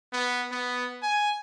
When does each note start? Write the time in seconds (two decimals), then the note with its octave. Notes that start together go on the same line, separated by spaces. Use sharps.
0.13 B3
0.51 B3
1.02 G#5